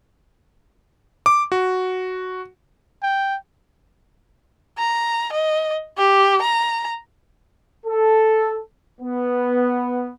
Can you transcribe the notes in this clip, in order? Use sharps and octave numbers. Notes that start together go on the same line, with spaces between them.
D6
F#4
G5
A#5
D#5
G4
A#5
A4
B3